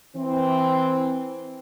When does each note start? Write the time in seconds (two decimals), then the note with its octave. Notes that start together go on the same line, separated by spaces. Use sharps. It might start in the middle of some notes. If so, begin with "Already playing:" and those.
0.16 E3 C4